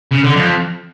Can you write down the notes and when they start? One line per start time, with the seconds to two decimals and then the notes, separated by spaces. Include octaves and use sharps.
0.11 C#3
0.23 D3
0.35 F2